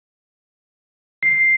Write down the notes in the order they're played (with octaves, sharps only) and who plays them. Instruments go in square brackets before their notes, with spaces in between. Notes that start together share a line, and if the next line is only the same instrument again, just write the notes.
[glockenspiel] C7